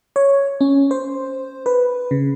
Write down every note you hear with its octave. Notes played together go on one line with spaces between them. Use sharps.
C#5
C#4
C5
B4
C#3